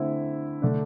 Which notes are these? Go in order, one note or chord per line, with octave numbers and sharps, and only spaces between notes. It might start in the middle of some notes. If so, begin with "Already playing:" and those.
Already playing: D3 A3 C4 E4
D3 A3 D4